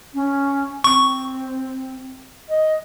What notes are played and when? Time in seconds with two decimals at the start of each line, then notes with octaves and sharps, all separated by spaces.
0.15 C#4
0.84 C4 C#6
2.49 D#5